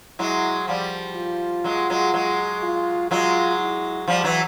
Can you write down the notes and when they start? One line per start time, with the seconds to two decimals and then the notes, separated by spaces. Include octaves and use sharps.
0.19 F#3 G#3 E4
0.67 F3 G3
1.16 F4
1.64 F#3 G#3
1.90 F#3 G#3
2.14 F#3 G#3
2.63 F4
3.11 F#3 G#3 F4
3.60 E4
4.08 F3 G3
4.24 E3 F#3